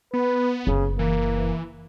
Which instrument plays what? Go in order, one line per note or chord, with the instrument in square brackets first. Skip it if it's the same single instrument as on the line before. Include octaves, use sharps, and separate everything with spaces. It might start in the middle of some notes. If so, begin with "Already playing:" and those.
[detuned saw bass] B3 [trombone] B4
[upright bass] F#1 [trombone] C#3
[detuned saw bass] E3 [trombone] A#3